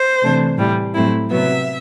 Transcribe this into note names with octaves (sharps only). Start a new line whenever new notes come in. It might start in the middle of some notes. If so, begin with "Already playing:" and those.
Already playing: C5
C3 E3 A3 D4
A2 E3 G3
A2 F#3 A3 C4 E4
C3 F#3 B3 E5